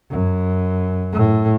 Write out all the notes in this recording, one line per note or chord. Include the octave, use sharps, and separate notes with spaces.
F#2
A2